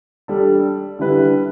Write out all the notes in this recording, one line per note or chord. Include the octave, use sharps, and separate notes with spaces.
G3 D4 A4
D3 G3 E4 B4